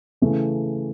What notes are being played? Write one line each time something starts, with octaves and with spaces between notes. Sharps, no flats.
C#3 E3 A3 C#4